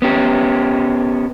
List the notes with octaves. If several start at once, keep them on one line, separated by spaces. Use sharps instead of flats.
B3 C#4 G4